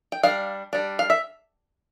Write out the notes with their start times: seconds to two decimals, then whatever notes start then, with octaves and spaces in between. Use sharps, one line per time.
0.12 G5
0.23 G3 D4 F5
0.73 G3 D4
0.99 F5
1.10 E5